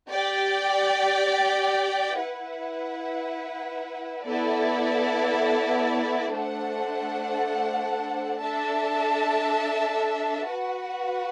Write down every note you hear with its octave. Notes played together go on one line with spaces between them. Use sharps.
G4 D5 G5
E4 B4 F#5
B3 E4 A4 D5
A3 D4 A4 C5 F#5
D4 A4 E5 A5
F#4 B4 F#5